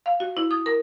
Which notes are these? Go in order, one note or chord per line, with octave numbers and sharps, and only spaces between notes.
F5
F#4
E4
D#6
A#4